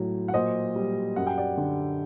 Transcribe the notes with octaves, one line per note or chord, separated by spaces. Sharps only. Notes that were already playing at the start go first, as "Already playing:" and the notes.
Already playing: A2 F#3
F#5
A#2 C5 D#5
G3
F#2 F#5
G5
D5 F#5
D3